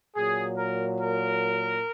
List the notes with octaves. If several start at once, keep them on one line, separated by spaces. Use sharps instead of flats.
A#2 F#3 G#4
A#4
A#4